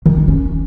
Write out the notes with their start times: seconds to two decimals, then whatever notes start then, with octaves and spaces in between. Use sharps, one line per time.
0.06 D#3
0.17 D#4
0.28 C#4